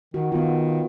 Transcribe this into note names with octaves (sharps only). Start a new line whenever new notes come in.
D#3 F#4
D#3 B3 F4